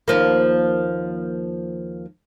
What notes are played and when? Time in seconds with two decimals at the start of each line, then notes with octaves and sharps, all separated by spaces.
0.08 D#2 F3 A#3